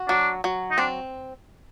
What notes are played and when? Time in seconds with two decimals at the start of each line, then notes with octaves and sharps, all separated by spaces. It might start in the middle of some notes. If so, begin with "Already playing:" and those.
Already playing: F#4
0.09 F#3 D4
0.44 F#3
0.71 D#4
0.78 C4 D4